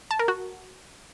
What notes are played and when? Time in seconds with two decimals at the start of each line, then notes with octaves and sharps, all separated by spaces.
0.11 A5
0.19 A#4
0.28 F#4